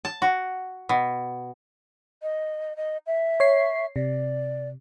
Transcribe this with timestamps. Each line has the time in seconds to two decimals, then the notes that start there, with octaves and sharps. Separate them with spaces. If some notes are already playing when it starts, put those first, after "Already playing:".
0.05 A5
0.22 F#4
0.89 B2
2.23 D#5
2.77 D#5
3.07 E5
3.40 C#5 C7
3.96 C3 D5